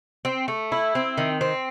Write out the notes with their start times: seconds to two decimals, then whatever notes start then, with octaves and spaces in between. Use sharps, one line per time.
0.25 C4
0.48 A3
0.72 E4
0.95 C4
1.18 D#3
1.41 C4